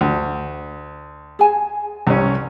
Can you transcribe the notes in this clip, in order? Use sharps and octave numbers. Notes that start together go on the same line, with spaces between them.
D2
G#4 G#5 A5
C2 C#4 B4